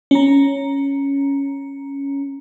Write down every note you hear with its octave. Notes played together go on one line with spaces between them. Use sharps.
C#4 A#5